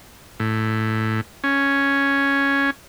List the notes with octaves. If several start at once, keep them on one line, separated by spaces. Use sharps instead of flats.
A2
C#4